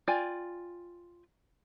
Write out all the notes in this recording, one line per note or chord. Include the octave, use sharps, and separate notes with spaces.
F4 D5 G5 G#5